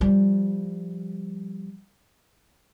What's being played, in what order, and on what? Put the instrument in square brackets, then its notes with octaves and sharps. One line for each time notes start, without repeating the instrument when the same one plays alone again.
[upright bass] F3 G3